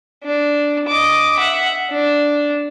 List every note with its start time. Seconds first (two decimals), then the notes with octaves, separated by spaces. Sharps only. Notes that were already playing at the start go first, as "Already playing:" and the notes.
0.24 D4
0.88 D#5 D6
1.37 E5 F#5
1.91 D4